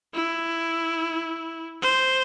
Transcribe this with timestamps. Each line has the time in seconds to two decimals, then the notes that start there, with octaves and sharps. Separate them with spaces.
0.14 E4
1.82 C5